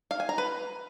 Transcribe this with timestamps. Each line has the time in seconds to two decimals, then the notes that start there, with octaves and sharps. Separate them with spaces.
0.11 F5
0.20 G#5
0.29 A#5
0.38 B4